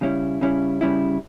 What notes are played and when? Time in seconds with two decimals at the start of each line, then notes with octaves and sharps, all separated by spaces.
0.01 C#3 G3 C#4 E4
0.41 C#3 G3 C#4 E4
0.81 C#3 G3 C#4 E4